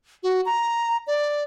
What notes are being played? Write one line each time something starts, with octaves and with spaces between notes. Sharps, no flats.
F#4
A#5
D5